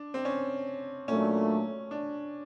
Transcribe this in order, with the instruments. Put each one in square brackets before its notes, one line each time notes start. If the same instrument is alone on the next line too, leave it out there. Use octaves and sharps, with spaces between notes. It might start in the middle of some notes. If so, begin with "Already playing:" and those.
Already playing: [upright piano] D4
C4
C#4
[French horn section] A#2 F#3 A3 D4 [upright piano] C#4
[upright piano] D4